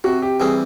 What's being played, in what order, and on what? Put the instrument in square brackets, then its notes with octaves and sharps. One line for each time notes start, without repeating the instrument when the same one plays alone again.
[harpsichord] C3 [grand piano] F#4
[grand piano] G4
[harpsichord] E3 G3 C4 [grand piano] G#4